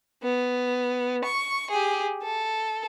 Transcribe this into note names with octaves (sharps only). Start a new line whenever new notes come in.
B3
C#6
G4 G#4
A4